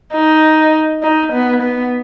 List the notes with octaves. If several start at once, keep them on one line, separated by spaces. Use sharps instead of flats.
D#4
D#4
B3
B3